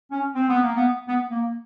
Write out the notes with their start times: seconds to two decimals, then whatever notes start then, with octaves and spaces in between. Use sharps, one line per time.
0.12 C#4
0.35 C4
0.49 B3
0.62 A#3
0.75 B3
1.07 B3
1.31 A#3